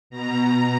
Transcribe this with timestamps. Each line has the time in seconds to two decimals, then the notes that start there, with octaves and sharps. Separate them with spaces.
0.10 B2 A#5